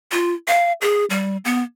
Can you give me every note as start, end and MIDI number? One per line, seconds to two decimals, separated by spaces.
0.11 0.33 65
0.48 0.72 77
0.81 1.05 68
1.10 1.37 55
1.45 1.62 59